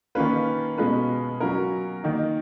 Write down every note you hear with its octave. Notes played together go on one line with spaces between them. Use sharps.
D#3 A#3 C#4 F4 B4
B2 G#3 C#4 F4 B4
F#3 C#4 F4 A#4
D#3 A#3 D#4